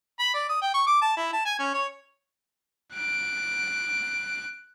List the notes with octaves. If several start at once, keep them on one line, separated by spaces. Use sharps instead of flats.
B5
D5
D#6
G5
C#6
D6
A5
E4
A5
G#5
C#4
C#5
F#6 D7